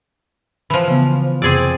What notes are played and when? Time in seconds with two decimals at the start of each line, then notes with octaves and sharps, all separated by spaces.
0.70 E3 F3
0.88 C#3 B3
1.42 F2 C3 C4 G#4 D5